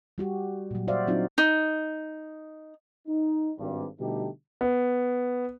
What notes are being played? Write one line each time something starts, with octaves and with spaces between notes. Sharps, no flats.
G3 F#4 G4
A#2 F#3
F#4 C5 D5 E5 F5
F#3 C4 D4 D#4 F4 F#4
D#4
D#4
G#1 G2
B2 D3 G3 A3 D#4 G4
B3